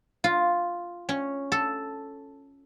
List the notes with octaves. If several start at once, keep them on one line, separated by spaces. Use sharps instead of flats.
F4
C#4
A4